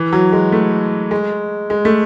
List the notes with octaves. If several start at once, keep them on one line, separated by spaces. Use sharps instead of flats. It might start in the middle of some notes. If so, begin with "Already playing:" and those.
Already playing: E3
F#3
G#3
A3
G#3
G#3
A3